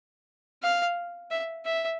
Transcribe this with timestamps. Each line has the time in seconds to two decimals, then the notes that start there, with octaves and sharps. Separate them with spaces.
0.63 F5
1.31 E5
1.66 E5